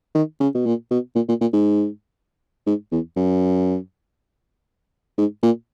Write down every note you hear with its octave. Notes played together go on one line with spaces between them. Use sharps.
D#3
C#3
B2
A#2
B2
A#2
A#2
A#2
G#2
G#2
E2
F#2
G#2
A#2